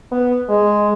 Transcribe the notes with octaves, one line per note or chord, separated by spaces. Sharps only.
B3
G#3